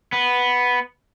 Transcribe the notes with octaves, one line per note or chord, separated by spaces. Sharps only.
B3